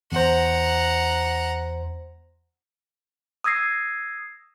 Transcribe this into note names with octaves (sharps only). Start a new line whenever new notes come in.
E2 C5 F#5 A#5
D#6 E6 G#6 A#6 C7